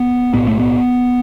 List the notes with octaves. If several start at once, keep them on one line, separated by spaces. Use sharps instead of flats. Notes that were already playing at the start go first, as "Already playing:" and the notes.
Already playing: B3
B1 A2 B3
A3
B3